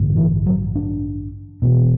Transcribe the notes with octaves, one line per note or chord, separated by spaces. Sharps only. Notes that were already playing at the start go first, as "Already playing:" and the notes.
Already playing: A1 G2 D3
E3
F#3
D4
E1 E2 B2